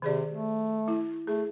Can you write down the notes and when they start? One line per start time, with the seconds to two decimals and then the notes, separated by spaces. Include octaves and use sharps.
0.02 C3 D#3 G#4 D5
0.30 A3
0.88 E4
1.27 A3 G#4